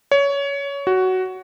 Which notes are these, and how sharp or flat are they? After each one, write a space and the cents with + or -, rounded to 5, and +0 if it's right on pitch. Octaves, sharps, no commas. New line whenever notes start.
C#5 +20
F#4 +10